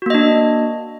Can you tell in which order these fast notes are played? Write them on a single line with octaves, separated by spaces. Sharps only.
F#4 A#3 D#5 D4